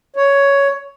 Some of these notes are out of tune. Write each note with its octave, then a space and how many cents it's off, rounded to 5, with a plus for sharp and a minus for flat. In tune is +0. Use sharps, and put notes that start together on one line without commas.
C#5 +10